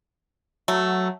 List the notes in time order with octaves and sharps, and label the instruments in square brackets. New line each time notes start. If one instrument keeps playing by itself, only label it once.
[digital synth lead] F#3 [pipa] A3